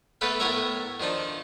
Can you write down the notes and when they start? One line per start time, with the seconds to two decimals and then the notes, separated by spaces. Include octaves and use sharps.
0.21 A3 B3 A4 B4 F5 G5
0.40 A2 B3 A#4 C#5 E5 A#5
1.00 D#3 F3 D4 D#4